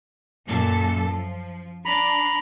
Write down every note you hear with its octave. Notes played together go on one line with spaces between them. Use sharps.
F#2 A#2 A4
F3
D4 A#5 B5